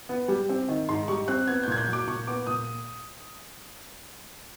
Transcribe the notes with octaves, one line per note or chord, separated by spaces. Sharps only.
B3
G3
C4
D#3
G#2 C6
G3 C#6
C4 F#6
B3 G#6
G6
A#2 G#6
G6
F#3
D6
A#2 C#6
B3 D6
A#2 D#6